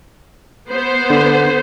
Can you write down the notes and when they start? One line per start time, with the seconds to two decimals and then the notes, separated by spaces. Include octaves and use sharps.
0.69 B3 C5
1.10 D3